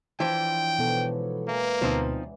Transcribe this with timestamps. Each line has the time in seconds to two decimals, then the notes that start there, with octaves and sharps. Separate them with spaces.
0.20 E3 F3 D4 C#5 D5 G5
0.79 G#2 B2 F#3 A4 B4
1.48 E3 A#3
1.82 D2 B2 F3 C4 D#4